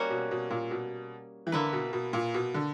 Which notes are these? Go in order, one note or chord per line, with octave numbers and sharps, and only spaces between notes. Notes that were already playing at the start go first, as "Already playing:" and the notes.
Already playing: G3 A#3 C#4 F#4
B2
B2
A#2
B2
E3
D3 A#3 E4 B4
B2
B2
A#2
B2
D3